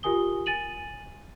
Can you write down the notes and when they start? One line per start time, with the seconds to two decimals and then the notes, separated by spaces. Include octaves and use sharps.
0.03 F4 G4 A#4 G#5 D#6 G7
0.46 G#5 A6 D#7 F#7